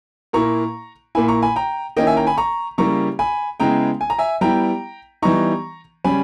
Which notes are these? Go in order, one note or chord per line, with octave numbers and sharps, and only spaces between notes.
A#2 A#3 E4 A#5 C#6
A#2 A#3 E4 G#5 B5
A#5 C#6
G#5 B5
G5 A#5
D#3 A#3 C#4 E4 D#5 G5
E5 G#5
G5 A#5
G#5 B5
A#5 C#6
C#3 G3 A#3 E4 A#5 C#6
G#5 B5
C#3 G#3 B3 E4 G5 A#5
G#5
A#5
E5 G#5
G3 B3 E4 G5 A#5
E3 G3 B3 D#4 A#5 C#6
C#3 G3 C#4 G#5 B5